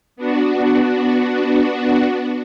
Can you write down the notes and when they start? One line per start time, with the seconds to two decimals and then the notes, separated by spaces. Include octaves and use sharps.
0.16 B3 D4 F#4